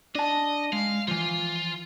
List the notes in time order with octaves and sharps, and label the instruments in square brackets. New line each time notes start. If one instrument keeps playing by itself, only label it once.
[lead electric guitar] D4 A5 [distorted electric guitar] D#5
[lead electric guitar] G#3 [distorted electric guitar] F5
[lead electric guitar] E3 F3 [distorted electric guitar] F4